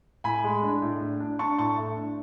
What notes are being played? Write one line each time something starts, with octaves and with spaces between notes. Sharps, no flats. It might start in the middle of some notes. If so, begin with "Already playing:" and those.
A2 G#5 B5
G#3
D4
A2
D4
D4
D4 A5 C#6
A2 A5 C#6
A3
D4